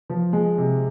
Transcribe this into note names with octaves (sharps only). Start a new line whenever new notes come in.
F3
G#3
C3